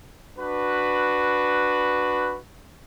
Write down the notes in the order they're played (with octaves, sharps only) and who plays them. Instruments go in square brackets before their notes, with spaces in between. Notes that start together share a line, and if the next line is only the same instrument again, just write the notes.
[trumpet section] D4 F#4 B4